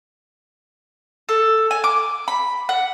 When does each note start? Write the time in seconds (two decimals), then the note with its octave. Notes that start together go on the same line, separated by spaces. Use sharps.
1.29 A4
1.71 G#5
1.84 D6
2.28 B5
2.69 F#5